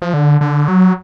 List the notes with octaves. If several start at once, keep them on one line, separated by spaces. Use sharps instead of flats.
F3
D3
D3
F#3